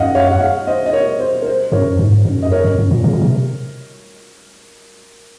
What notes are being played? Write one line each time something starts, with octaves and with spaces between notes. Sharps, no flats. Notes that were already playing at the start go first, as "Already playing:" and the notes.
Already playing: F#2 D#5 F5 F#5
C#5 F5
F#5
C#5 F5
C5 D#5
D#5
A#4 C#5
C5
A#4
C5
F#2 A#4 C#5
G#2
F#2
D#5
A#4 C#5
F#2
F#2
A#2
C#3
A#2
C3